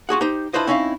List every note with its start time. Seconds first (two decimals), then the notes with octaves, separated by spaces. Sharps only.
0.09 F4 F#4 G#4 F#5
0.21 D#4 G4 C5
0.53 D4 E4 F4 B4 C5 D#5
0.67 C4 C#4 D#4 E4 E5 F5